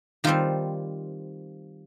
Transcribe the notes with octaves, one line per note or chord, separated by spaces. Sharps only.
D#3 G3 C4 F4